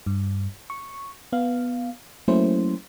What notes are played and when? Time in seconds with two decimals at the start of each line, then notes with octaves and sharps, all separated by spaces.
0.06 G2
0.70 C#6
1.33 B3 F5
2.28 F#3 A3 A#3 C#4 E4 C5